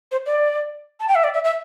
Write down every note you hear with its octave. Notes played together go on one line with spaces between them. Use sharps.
C5
D5
A5
G5
E5
D5
E5
E5